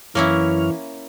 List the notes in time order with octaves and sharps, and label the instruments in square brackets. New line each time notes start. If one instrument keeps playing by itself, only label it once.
[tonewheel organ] F#2 C#5 F6 [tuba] E3 [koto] A#3 C#4 E4